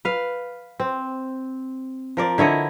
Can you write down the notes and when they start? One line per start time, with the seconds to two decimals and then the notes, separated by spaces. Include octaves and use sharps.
0.05 B4 F5
0.80 C4
2.17 F3 A#4 D5
2.38 D3 E4 C#5 D#5